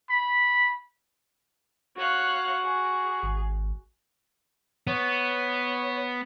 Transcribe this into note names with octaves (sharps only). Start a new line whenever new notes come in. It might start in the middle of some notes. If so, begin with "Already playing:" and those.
B5
F#4 C#5 F5 F#6
G#4
G#1
B3 C#5